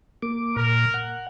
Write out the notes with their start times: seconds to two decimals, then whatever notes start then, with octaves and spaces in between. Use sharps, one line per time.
0.22 A#3 D6
0.56 A#2 A#4
0.94 F#5